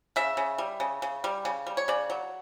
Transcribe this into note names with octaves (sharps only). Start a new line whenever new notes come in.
C#3 E5
C#3
G3
C#3
C#3
G3
C#3
G3
C#5
C#3 D5
F#3